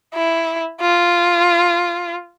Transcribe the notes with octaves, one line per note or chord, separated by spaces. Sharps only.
E4
F4